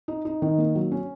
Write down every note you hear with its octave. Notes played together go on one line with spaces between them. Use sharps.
D#4
D#4
D#3
A#3
F#3
C#4